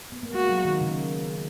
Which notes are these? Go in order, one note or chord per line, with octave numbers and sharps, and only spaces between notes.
B3
A#3
G#3 F#4
F#3
D#3
C#3